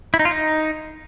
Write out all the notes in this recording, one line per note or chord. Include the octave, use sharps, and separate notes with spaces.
E4
D#4
F4
D#4